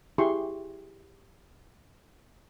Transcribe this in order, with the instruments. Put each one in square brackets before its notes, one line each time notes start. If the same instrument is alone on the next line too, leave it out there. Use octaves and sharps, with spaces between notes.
[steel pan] E4 G4 G#4 C6 C#6